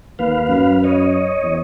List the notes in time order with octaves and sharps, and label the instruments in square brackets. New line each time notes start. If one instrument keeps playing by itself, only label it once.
[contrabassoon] D#2 [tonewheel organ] B4 F5
[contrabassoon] F#2
[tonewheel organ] C#5 D#5
[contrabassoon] E2